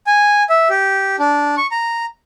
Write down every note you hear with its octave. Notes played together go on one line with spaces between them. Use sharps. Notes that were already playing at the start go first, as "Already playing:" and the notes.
G#5
E5
G4
D4
C#6
A#5